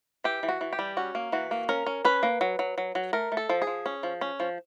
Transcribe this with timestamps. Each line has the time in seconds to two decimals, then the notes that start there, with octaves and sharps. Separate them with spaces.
0.24 E3 G4
0.43 E3
0.49 F#4
0.61 E3
0.73 G4
0.79 G3
0.97 C#4 F#4
1.15 A#3
1.32 E3 F#4
1.51 A#3
1.69 C#4 A#4
1.86 C#4
2.05 C#4 B4
2.23 A#3
2.41 F#3
2.59 F#3
2.78 F#3
2.95 F#3
3.13 A3 A#4
3.32 A3
3.37 A4
3.49 F3
3.62 G#4
3.67 F3
3.86 C#4
4.03 F3
4.21 C#4
4.40 F3